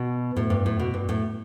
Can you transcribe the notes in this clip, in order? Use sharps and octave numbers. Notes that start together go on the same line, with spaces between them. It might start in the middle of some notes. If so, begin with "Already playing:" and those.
Already playing: B2
A2
G2
A2
B2
G2
A2